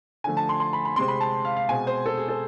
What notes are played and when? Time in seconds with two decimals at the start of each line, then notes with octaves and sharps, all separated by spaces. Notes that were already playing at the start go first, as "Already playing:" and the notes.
0.24 D3 F3 A3 G#5
0.37 A5
0.49 C6
0.60 C6
0.73 B5
0.85 B5
0.96 C3 G#3 C4 C6
1.08 B5
1.21 A5
1.45 F5
1.57 F5
1.69 B2 G#3 C4 G#5
1.87 C5
2.06 A4
2.18 G#4
2.29 A4